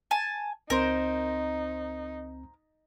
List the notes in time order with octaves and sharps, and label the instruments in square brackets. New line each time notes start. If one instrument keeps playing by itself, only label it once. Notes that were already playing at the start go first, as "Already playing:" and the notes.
[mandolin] G#5 A5
[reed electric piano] C#2 C4 [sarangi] D#4 [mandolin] A#4 C5